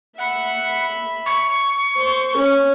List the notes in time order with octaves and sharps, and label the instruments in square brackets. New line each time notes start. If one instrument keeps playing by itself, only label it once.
[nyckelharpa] E5 B5 [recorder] F#5
[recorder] C#6
[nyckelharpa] C5
C#4